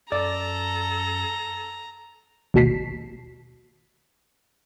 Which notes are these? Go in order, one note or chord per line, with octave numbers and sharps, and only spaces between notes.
F#2 A4 D5 A#5
G#1 D#2 B2 A5 B6 C7